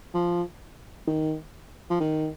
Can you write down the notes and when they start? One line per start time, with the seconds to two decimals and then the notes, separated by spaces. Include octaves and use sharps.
0.14 F3
1.07 D#3
1.90 F3
2.00 D#3